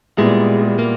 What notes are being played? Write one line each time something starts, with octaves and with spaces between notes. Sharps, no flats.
A#2 G3 G#3 B3 E4
A#3